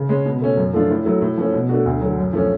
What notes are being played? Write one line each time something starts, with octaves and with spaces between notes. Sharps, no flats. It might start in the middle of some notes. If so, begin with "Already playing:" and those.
Already playing: C#3
G#3 C#4
B2
A3 C#4
F#2
F3 A3 D4 F4
A2
F#3 A3
A2
F3 A3 C#4
B2
A3 D4 F#4
D2
D3 F#3
F#2
F3 A3 C#4